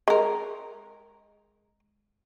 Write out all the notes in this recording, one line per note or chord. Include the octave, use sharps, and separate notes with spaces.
G#3 A#4